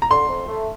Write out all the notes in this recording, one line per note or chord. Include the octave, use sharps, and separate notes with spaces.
A#5
D3 C6
F2
A3